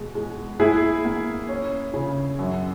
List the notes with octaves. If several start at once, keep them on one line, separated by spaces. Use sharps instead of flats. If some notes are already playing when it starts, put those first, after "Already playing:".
Already playing: B2 G#3
G#3
A#3 E4 G#4
A#3
C#4
C#3
F#2